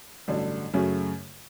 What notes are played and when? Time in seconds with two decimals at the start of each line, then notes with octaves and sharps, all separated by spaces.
0.28 A1 G2 D3 F#3
0.73 F#2 C#3 F#3 A3 C#4